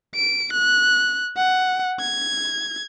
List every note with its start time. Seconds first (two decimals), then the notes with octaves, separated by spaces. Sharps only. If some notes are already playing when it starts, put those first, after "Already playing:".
0.15 D7
0.53 F#6
1.37 F#5
2.00 G#6